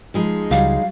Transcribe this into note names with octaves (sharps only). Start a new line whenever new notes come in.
F3 G#3 D#4
C#2 F#3 G3 F5